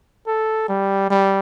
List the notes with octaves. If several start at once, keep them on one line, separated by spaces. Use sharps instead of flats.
A4
G3
G3